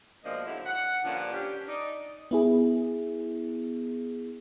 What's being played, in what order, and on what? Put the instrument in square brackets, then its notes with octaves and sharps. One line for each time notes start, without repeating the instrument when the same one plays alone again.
[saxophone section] B2 F3 G#3 A#3 D4 D#5
G#2 D3 F#3 E4
F#5
G2 A#2 D3 F3 C#4 D4
C#4 D4 G4
D#4 D5 D#5
[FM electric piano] B3 E4 G#4